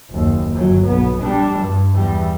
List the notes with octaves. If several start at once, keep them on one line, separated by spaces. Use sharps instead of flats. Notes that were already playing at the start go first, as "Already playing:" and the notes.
F#1 D#2
G1 F#3
B1 B3
G3 D4
G2
E2 G3